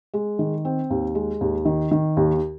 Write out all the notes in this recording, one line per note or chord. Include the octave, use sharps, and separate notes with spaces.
G#3
D#3
C4
D#2
G#3
D#2
D#3
D#3
D#2